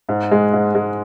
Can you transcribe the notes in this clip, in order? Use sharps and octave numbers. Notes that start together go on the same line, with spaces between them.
G#2
G#3
G#2
G#3